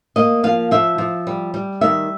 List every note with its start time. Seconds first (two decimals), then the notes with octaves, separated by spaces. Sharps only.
0.16 A#3 D#5
0.43 F3 F5
0.71 F3 E5
0.98 F3
1.27 G3
1.54 G3
1.81 D#3 E5